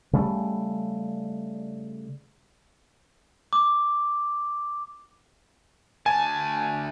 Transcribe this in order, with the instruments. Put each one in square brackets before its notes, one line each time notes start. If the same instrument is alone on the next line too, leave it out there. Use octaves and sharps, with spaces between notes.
[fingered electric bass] C#3 G3 A3
[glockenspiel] D6
[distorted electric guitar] D2 A5 [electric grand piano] G#5